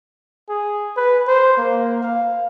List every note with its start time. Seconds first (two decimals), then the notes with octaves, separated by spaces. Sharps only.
0.49 G#4
0.96 B4
1.27 C5
1.57 A#3
2.02 F5